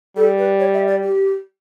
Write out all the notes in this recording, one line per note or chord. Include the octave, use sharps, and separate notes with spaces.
G3 A4
B4
C#5
E5
D5
G4